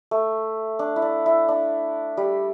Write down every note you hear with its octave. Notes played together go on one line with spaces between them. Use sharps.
A3
D4
E4
D4
E4
D4
G3